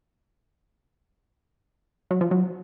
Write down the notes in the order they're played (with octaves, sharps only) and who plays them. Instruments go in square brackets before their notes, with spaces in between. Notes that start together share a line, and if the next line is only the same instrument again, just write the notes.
[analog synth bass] F#3
F3
F#3